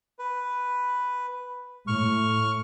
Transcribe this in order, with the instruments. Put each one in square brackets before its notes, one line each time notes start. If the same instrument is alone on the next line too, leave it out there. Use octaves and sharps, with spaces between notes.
[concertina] B4
[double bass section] A2 [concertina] C#6 F6